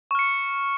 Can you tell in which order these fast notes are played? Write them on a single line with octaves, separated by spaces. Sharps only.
C#6 F6 C#7